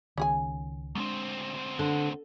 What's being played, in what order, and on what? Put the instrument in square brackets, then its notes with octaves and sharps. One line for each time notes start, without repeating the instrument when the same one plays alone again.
[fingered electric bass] C#2 D#3 [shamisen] C#4 G#4 G#5
[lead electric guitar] D2 C4 [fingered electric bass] G#3 B3 D4
[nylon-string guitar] D3